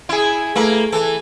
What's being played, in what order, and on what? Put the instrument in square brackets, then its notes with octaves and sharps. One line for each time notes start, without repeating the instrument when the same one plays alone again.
[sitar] E4 G#4
[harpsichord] A3 E4 B4 [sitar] A#3
[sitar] E3 [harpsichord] A4